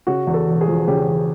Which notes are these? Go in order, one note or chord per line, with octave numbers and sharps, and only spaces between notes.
C#3 F#4
E2
A4
E1
G#4
F3
C#3 G4
E2